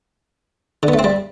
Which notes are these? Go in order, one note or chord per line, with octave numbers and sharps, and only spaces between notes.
D3
B3
A3
C4
G3